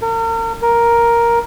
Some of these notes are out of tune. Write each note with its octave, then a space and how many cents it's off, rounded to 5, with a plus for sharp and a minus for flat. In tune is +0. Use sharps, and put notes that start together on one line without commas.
A#4 -40
A#4 +5